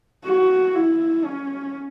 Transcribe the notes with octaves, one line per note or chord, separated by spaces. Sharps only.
F#4
E4
C#4